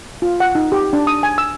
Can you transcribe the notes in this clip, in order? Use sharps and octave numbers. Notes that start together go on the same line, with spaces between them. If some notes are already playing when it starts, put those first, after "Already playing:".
F4
F#5
D#4
G4
D4
D#6
G#5
E6